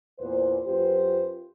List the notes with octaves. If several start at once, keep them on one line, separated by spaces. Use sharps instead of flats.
E2 A#2 B4 C5
F#2 F4 G4 B4 C5